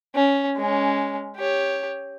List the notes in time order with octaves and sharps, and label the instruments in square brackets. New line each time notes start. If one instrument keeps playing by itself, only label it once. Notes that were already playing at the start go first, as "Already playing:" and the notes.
[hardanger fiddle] C#4
G#3 C#4
G4 C#5